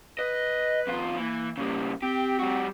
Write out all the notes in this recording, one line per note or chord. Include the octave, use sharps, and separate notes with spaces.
B4 D#5
E2 F4
E3 A#3
C#3 G3 A#3
C4 G4
G3 F#4